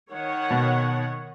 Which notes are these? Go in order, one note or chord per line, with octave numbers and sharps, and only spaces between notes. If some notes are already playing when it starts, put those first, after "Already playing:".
D#3 C#5 F#5
B2